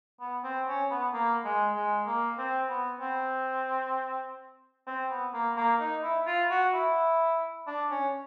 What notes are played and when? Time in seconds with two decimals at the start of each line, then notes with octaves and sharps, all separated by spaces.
0.20 B3
0.44 C4
0.67 C#4
0.90 B3
1.13 A#3
1.45 G#3
1.76 G#3
2.06 A#3
2.38 C4
2.69 B3
3.00 C4
4.87 C4
5.10 B3
5.34 A#3
5.56 A#3
5.80 D#4
6.03 E4
6.26 F4
6.50 F#4
6.74 E4
7.67 D4
7.90 C#4